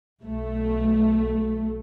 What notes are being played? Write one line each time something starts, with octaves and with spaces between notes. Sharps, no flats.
B1 A3